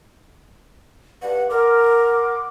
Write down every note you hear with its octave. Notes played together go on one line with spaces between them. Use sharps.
G2 F#5
A#4 F#5 C6 D6